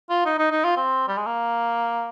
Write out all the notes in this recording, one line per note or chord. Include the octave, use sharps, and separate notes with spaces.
F4
D#4
D#4
D#4
F4
C4
G3
G#3
A#3